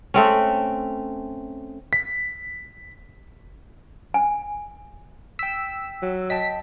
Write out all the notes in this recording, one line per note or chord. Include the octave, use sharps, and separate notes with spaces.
A3 C4 C#4
B6
G#5
G5 E6 B6
F#3
D#5 G5 A5 B6